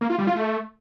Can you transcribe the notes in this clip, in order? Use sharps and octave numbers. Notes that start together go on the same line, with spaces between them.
A#3
F4
G3
F4
A3